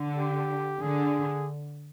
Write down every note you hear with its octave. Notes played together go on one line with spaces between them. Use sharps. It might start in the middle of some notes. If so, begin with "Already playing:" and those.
Already playing: D3
G4
D3 G#4